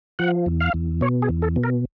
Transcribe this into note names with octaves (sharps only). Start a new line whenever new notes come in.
F3 F#5
E2
F5
E2
B2 C#5
G#4
E2
A4
B2
A#4